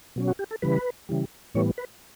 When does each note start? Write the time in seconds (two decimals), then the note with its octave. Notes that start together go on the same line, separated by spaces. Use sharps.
0.16 B2 F#3 C#4
0.28 F#4
0.39 G4
0.51 A4
0.62 C#3 E3 G3 B4
1.09 C#3 E3 G3
1.54 A2 E3 G3 B3 C#5
1.78 B4